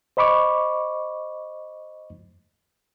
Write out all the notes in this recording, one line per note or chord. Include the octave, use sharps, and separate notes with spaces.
C5 D#5 B5 C#6 D6